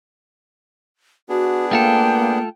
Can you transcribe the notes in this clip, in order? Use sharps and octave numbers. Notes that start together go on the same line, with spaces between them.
B3 D4 F#4 G#4
A3 A#3 F4 A4 G5